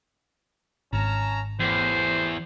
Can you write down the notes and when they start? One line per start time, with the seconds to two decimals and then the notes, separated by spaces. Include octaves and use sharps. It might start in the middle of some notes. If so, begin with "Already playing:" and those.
0.93 G#1 C#4 A5 A#5
1.60 E2 A2 G4 C5